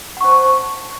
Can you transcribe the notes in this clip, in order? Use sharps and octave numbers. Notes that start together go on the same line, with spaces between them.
C5 D5 F#5 A5 C#6